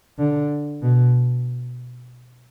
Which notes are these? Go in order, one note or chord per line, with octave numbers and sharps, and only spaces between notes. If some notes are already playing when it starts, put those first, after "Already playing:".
D3
B2